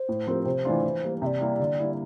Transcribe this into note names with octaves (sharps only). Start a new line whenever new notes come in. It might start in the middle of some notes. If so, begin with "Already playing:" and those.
Already playing: C5
A2
F3 C4 G4 A#4
C3 C5
E3 A3 D4 F4
E3
G3 A#3
C3 D5 E5
G3 A#3 E4
D3
G3 A#3 E4